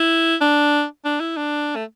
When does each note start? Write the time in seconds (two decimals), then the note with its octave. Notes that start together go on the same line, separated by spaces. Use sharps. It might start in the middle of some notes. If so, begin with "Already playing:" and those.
Already playing: E4
0.41 D4
1.05 D4
1.20 E4
1.37 D4
1.76 A3